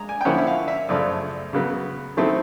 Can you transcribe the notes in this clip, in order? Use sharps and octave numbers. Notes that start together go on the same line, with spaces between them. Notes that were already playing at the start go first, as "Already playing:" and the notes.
Already playing: G#3 A#5
G#5
G5
D3 F3 A#3 C#4 E4 F#5
E5
F5
E5
F#2 C#3 F3 A3 D5
C#3 F#3 B3
D#3 F#3 A3 C4 E4